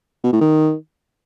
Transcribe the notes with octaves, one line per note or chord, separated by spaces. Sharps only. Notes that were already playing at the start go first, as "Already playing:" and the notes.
B2
A2
D#3